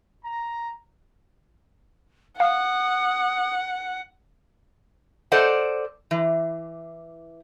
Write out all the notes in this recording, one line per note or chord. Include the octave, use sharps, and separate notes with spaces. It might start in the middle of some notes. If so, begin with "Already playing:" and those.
A#5
F5 F#5 D#6
A4 C5 D5 D#5 F#5
E3